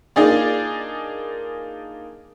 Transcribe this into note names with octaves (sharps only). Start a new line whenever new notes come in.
A#3 D4 D#4 F4 G#4 D5